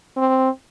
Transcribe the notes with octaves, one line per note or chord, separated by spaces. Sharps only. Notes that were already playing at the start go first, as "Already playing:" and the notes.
C4